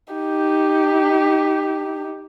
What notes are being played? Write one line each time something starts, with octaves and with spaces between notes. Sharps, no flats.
D#4 G4